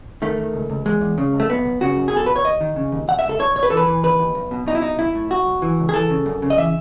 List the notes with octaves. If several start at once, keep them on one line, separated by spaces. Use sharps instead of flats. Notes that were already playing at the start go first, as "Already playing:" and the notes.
D#3 A3
D#3
C#2
C#2
E2 G#3
E2
C#3
C#2
A3
B1 B3
B1
C#3 F#4
F#2
G#4
B2 A4
B2 B4
C#5
D#2 D#5
D#3
C#3
D#2
B2 F#5
E5
C#2
A4
B1 C#5
B2 C#5
B4
E3 A4
B4
E3
D#2 B4
D#2
B1
B2
B2 D#4
E4
B1 D#4
B1 E4
A2
B1 F#4
B1
E3
C#2
G#4
E3 A4
C#3
F#2
C#3
D#5
E3 E5